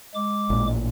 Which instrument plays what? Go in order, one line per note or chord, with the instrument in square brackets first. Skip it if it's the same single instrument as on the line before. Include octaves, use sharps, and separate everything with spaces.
[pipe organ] G#3 D6
[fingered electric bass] A1 A#2